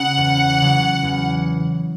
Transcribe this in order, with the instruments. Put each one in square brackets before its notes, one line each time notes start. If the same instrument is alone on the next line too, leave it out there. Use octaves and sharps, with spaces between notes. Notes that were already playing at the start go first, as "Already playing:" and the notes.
Already playing: [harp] C#3 [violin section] F#5
[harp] E2
C#3 F#3
E2